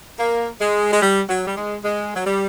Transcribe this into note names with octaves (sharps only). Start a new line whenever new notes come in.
A#3
G#3
G#3
G3
F#3
G3
G#3
G#3
F#3
G3